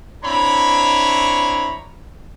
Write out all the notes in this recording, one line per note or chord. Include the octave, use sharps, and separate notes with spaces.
C4 D4 E4 C#5 A#5 B5